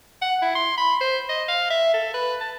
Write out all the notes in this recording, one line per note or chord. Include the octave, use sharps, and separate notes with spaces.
F#5
E4
C6
B5
C5
D#5
F5
E5
A4
B4
A5